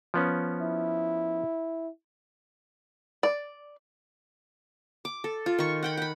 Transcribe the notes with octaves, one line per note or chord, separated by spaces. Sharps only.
F3 B3 C#4
E4
D5
D6
A4
F4
D#3 C#6
F#5 G5 B5
F#5 B5